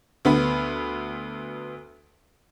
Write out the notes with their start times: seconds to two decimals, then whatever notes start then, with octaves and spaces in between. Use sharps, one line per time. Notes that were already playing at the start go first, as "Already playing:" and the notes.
0.25 D2 B3 B5